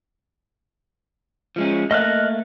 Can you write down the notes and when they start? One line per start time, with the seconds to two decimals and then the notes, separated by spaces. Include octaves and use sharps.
1.56 F3 G#3 C#4
1.91 A3 A#3 D#5 F6 F#6